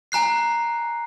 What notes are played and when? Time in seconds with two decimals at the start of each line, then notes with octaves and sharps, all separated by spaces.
0.12 G#5 A#5 F#6 C7